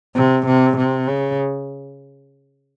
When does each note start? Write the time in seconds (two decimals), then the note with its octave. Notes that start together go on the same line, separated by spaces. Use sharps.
0.15 C3
0.46 C3
0.77 C3
1.08 C#3